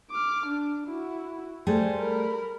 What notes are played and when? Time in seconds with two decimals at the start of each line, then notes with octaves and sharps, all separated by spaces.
0.11 D6 F6
0.46 D4
0.86 E4 F#4
1.67 G3 A3 G#4 C5
1.99 A#4 B5